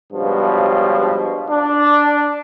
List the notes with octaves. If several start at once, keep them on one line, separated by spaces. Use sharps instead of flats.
C#2 G2 B2 F3
D4